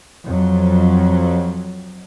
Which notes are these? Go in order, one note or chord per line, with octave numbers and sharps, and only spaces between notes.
F2 F#3